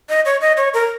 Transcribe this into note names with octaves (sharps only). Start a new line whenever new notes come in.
D#5
C#5
D#5
C#5
A#4